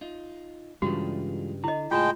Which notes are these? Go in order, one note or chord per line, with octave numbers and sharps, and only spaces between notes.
D#4 F4
G2 C#3 E3 G3 G#3 F4 F#4
D3 E4 D#5
C#2 A2 G#3 F4 G5 A5